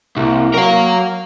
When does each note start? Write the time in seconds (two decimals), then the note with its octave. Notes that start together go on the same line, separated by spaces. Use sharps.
0.17 C2 A#3
0.54 F#3 A#4 F5